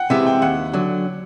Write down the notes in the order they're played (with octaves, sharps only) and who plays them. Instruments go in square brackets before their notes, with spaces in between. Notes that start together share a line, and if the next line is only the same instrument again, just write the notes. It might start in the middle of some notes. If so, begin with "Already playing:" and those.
Already playing: [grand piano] F#5 G5
[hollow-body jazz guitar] C3 E3 G#3 [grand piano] E5
[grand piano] G5
[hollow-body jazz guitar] D#2 [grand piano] F#5
[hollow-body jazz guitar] D3 F#3